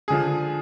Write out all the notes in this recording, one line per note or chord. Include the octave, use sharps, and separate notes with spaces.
D3 F3 G#4